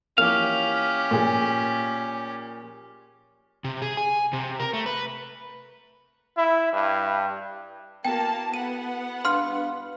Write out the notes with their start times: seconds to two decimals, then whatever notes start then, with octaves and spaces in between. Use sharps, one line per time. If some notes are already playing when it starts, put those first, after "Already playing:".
0.18 E3 F3 A#3 C#4 G4 F5
1.11 A#2 F3 G#4
3.64 C3
3.82 G#4
3.97 G#5
4.33 C3
4.60 A#4
4.73 A3
4.86 B4
6.37 E4
6.73 G2
8.05 A#3 B3 E4 F#4 G5 A5
8.54 B3 A4 F#5 D#7
9.25 D4 B4 F5 C6 F6